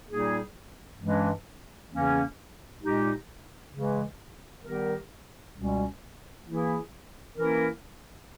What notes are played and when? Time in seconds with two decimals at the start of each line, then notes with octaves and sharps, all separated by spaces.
0.07 A#2 G3 A#3 D#4 G#4
0.99 G2 E3 G#3 C#4
1.90 E2 C#3 E3 A#3 C#4
2.80 A#2 G#3 D#4 G4
3.71 C#3 E3 G#3
4.63 D#3 G3 B3 G4 A#4
5.53 C#2 B2 G3 C#4
6.45 E3 A#3 E4 G#4
7.36 E3 A#3 C#4 E4 A#4